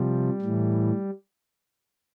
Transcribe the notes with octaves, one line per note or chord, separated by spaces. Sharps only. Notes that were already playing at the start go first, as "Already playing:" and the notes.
Already playing: C3 F3 G3
A2 E3